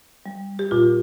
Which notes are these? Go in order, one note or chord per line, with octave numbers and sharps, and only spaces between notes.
G3
G4
A#2 F4